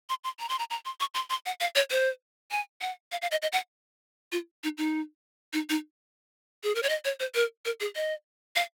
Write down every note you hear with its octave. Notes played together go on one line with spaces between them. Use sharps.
C6
C6
A#5
C6
A#5
A#5
C6
C#6
C6
C6
F#5
F5
C#5
C5
G#5
F#5
F5
F5
D#5
D#5
F#5
F4
D#4
D#4
D#4
D#4
G#4
A#4
C#5
D#5
C#5
C5
A#4
A#4
G#4
D#5
F5